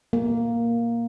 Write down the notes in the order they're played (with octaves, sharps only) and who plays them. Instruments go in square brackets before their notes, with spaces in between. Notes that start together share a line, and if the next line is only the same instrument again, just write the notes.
[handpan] A#3